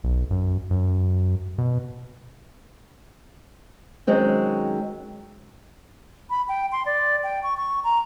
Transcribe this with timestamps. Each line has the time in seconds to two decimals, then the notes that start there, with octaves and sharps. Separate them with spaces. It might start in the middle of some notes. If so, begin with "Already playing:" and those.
0.04 B1
0.31 F#2
0.71 F#2
1.58 B2
4.07 D#3 F#3 G#3 C4 C#4
6.30 B5
6.48 G5
6.72 C6
6.86 D5
7.23 G5
7.43 C#6
7.57 C#6
7.84 A#5